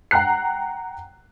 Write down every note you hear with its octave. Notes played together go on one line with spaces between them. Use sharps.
F#5 G5 A#5 F#6 C7